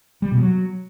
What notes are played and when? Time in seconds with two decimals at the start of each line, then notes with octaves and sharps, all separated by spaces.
0.22 G3
0.32 B2
0.41 F#3